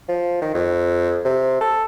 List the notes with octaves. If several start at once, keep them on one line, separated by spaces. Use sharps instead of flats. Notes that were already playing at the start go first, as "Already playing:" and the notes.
F3
D#3
F2
C3
A4